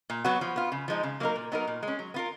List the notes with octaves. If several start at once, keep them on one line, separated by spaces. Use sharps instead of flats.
A#2
F#3 B3 F#4
F3
B3 F4
C#3
F3 G#3 D#4
C#3
F#3 A#3 D#4 A#4
A#2
F#3 B3 D#4 A#4
A#2
G#3
C#4
F#3
B3 F4 A#4